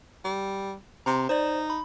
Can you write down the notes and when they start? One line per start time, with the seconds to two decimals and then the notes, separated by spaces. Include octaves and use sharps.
0.25 G3
1.06 C3 A#5 C6
1.29 D#4 C5 D5
1.70 B5